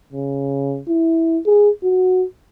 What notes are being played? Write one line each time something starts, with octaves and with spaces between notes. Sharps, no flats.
C#3
E4
G#4
F#4